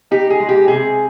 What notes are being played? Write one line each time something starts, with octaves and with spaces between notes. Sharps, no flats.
D#4 G4
G#4
G#3
G4
C3 G#4